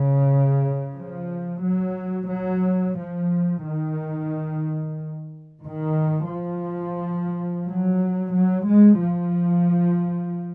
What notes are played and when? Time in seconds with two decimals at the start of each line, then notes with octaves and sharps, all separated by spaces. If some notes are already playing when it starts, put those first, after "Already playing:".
Already playing: C#3
0.96 F3
1.63 F#3
2.29 F#3
2.97 F3
3.63 D#3
5.64 D#3
6.32 F3
7.65 F#3
8.33 F#3
8.66 G#3
8.99 F3